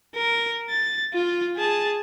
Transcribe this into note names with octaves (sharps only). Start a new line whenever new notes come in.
A#4
A6
F4
G#4 A5